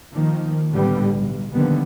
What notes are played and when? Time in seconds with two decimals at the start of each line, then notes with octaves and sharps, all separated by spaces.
0.12 D#3 F3 A#3
0.72 A2 D3 G3 B3
1.14 B1
1.52 D3 D#3 F3 G3 A#3 B3